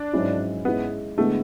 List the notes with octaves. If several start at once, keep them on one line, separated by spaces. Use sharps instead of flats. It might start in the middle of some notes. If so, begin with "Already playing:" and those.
Already playing: D4
G#2 F#3 C#4 E4
G#2 G#3 B3 C#4 E4
D3 G#3 A3 B3 E4